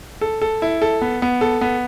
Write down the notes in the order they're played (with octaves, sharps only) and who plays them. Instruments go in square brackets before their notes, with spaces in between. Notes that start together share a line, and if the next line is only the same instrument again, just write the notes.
[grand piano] A4
A4
E4
A4
B3
B3
A4
B3